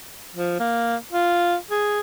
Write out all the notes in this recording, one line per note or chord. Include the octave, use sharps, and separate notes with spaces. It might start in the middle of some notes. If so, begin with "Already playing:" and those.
F3
A#3
F4
G#4